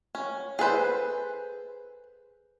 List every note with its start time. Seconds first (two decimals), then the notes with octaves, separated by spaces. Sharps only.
0.15 C#4
0.59 G#4 A4 B4 C5